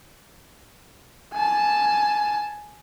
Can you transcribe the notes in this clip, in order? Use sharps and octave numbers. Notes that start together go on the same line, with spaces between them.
G#5 A5